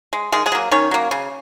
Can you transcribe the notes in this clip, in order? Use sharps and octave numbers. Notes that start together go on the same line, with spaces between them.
G#3
D#3 G#3 G#4
G#3 G#4
F#3 A#3
D#3 C#4 C#5
F#3 A#3
C#3